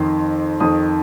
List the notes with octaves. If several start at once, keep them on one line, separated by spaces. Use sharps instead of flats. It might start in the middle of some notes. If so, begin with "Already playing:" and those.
Already playing: F2 D#3 C6
F2 D#3 D#6